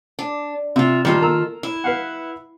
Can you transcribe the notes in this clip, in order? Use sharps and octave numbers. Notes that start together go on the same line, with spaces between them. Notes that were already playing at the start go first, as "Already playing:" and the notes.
D4
C3 F4 E5
A#2 D#3 G3 F4 A4
A#3 A#5 E6
E4
B4 F5 F#5